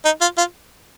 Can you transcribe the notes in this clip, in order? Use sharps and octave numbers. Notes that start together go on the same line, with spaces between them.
D#4
F4
F4